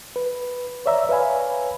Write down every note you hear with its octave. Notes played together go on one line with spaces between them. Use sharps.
B4
C#5 D5 E5 A#5 E6
B4 C#5 F5 G#5 B5